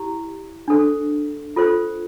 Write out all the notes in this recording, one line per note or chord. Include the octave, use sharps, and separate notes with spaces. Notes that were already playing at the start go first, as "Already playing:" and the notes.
Already playing: E4 G4
D4 A4 C5
F4 A4 C5